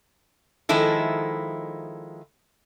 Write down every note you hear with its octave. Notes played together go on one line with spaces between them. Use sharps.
D#3 F3 G#3 E4 A4